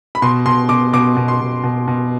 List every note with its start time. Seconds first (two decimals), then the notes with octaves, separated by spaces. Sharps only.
0.15 B5
0.22 B2 C6
0.46 B2 C6
0.69 B2 D6
0.93 B2 D6
1.16 B2
1.28 C6
1.40 B2
1.63 B2
1.88 B2